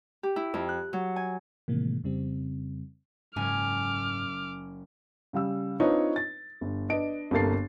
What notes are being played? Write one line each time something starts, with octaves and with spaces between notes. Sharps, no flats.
G4
E4
F2
F#6
F#3
G#5
A2 C3 D#3 E3 G#3 A#3
F2 C#3 G3 C4
F#1 G#2 C#4 G#5 D6 F6
C#3 G3 F5 E6
C4 D4 D#4 F4 B4 C#5
A6
G1
D4 B4 D#5 D7
G1 C2 A#3 A4 A6 C7